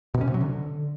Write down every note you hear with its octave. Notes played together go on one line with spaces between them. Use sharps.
B2
C#4
C3
F#3
D3